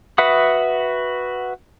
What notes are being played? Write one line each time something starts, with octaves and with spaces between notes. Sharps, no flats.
F#4 B4 E5 F#5 D#6